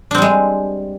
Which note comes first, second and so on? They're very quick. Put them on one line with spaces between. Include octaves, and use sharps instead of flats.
D4 C4 G3 G#3